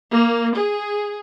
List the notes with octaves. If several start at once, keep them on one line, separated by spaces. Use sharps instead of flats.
A#3
G#4